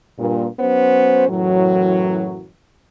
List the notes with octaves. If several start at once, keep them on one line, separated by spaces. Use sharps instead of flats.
G2 A#2
F#3 B3 C#4 C5
F#2 A2 E3 F#3